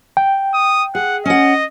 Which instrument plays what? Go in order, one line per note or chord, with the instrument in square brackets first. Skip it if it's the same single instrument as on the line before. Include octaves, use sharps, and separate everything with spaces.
[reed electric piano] G5
[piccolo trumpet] D#6
[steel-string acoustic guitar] G#4 [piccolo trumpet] F#5
[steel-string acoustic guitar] C#4 F#5 [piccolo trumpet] D#5